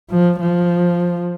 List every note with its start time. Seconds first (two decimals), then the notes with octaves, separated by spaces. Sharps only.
0.10 F3
0.40 F3